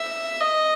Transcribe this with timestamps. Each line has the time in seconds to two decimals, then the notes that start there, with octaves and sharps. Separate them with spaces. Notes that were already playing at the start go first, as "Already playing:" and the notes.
Already playing: E5
0.40 D#5